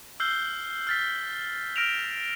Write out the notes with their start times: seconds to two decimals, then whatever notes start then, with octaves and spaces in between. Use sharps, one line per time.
0.20 E6 F6 G6 C7 G7
0.87 F6 A6 B6
1.76 F6 A#6 D7 E7 F7